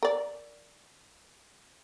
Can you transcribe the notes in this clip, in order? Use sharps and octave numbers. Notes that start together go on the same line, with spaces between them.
A#4 D5